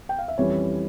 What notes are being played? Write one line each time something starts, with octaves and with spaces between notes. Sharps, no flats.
G5
F5
E5
F2 E3 G3 C#4 C#5